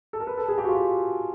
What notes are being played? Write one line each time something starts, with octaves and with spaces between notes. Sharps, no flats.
A4
A#4
B4
A4
G#4
G4
F#4
F4